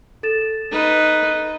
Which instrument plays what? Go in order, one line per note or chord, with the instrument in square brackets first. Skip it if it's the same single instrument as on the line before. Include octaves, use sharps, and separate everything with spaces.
[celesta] A4 A6 E7
[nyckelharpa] D#4 B4